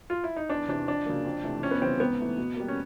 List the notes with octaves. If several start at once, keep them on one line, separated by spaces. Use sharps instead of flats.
F4
E4
D#4
E2 D4
C3 E3 D4
F2 D4
C#3 F#3 A#3
F2
C3 E3 A3
F2 C#4
B3
C#3 E3 G3 C4
G#2 B3
E3 A3
B2
G3 A#3
C#4